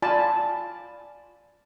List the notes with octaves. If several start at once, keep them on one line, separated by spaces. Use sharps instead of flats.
F4 D5 G#5 A5 B5